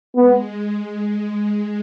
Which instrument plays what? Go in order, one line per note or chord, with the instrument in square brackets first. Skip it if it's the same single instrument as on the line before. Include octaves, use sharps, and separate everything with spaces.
[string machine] G#3 [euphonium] B3